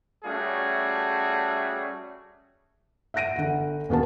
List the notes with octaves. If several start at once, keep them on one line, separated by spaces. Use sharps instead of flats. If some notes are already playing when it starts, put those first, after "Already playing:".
G3 A3 C#4 F#4 G#4
E5 F#5 F#6 A#6 D7 D#7
G1 F#5
D#1 A#3 B3 F#4 A5